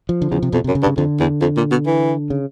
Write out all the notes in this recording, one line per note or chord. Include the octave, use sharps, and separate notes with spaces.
F3
D3
E2 C#3
C3
F2 B2
F#2 C3
C#3
G2
C#3
F2 D3
E2
F2
A#2
B2
E3
C#3